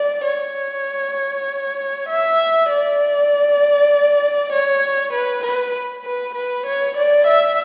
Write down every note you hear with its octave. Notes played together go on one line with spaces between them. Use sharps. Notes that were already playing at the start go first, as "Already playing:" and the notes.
Already playing: D5
C#5
E5
D5
C#5
B4
B4
B4
B4
C#5
D5
E5